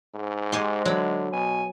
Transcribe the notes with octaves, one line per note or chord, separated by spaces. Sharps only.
G#2
G#3 G4 C5 G#5
D3 F#3 B5
B2 G#5